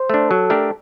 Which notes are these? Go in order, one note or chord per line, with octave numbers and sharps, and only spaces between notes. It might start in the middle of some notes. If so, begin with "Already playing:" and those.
Already playing: C5
A3 D4
F#3 A4
A3 D4 G4 A#4